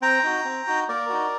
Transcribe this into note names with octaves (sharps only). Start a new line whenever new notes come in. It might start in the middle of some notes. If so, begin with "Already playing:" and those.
C4 G5 A#5
D#4 F#4
C4
D#4 F#4
A#3 A#4 D5
D#4 F#4